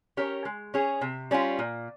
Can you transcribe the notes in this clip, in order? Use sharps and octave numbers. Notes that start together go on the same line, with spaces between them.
C#4 G4 A#4 C#5
G#3
C#4 G#4 C#5
C3
G3 C#4 F4
A#2